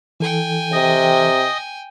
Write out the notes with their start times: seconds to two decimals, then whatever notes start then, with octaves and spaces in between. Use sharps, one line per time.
0.20 E3 A4 G5 G#5
0.72 C3 D#5 D#6